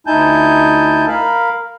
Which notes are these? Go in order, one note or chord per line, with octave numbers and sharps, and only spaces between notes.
D2 D#4 E4 G#5 A5 G6
A#4 F5 B5